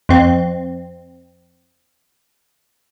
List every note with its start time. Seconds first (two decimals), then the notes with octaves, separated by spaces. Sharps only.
0.09 F2 C4